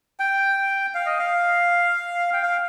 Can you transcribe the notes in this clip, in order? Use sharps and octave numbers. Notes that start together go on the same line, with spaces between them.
G5
F5
D#5
F5
G5
F5